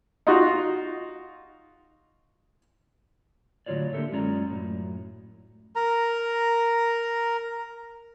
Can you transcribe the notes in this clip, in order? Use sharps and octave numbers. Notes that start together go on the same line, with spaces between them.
D#4 F4 F#4
A2 D3 F#3 F4 C#5 D5
D3 A#3 G4 A4 A#4 E5
F#2 G#3 C#4 F4 D5 A#5
F#2 A2
A#4 A#5